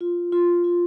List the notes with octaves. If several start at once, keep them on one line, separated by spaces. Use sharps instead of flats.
F4
F4
F4